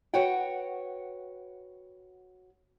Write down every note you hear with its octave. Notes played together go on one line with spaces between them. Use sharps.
F#4 B4 C#5 F#5 G5